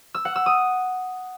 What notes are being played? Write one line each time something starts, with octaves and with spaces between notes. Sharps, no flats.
E6
F#5
E6
D#6